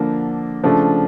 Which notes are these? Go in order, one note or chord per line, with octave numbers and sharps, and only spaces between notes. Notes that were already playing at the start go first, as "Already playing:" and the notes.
Already playing: D3 F3 A#3 D4
C#3 F3 A3 D4